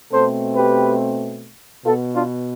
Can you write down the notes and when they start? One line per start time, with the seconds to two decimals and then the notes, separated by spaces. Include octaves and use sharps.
0.12 B2 A3 C4 A4 C5
0.56 G4 B4
1.85 B2 B3 F4 A4
2.14 D4 F4